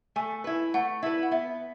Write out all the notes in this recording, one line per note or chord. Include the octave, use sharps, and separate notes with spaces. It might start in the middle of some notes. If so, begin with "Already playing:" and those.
A3 G#5
E4 B4
A3 F#5
E4 B4
F#5
B3 E5